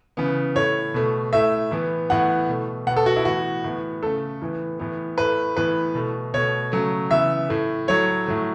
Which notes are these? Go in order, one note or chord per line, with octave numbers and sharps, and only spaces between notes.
C#3 E3 B3
A2 A3 C#5
B2 A3
A2 A3 E5
A2 E3 B3
A2 E3 B3 F#5
B2 A3
B2 B3 F#5
A4
F#4
E4
A2 E3 B3 F#4
A2 E3 B3
C#3 A3 A4
A2 E3 B3
A2 E3 B3
A2 A3 B4
A2 E3 B3 B4
B2 A3
B2 A3 C#5
C#3 F#3 A3
C#3 E3 B3 E5
A2 A3
A2 F#3 A3 C#5
A2 F#3 A3